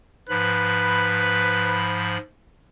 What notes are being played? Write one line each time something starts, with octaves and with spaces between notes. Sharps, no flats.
G#2 F3 B4 B5